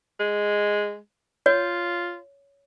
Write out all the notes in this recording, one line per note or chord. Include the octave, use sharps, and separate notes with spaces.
G#3
F4 C#5